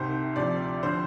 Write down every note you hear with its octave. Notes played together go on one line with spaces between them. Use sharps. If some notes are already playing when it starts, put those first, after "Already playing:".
Already playing: C2 C3 D#3 C5
D2 C3 F3 D5
D3 F3 C5